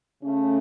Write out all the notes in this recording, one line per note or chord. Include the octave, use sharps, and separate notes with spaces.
C#3 A3 C#4